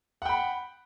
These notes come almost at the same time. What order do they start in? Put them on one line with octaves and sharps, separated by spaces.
F#5 G5 B5